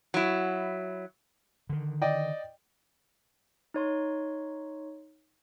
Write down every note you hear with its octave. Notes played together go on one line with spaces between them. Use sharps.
F#3 E4
D3 D#3
D5 D#5 G5
D#4 C#5 C6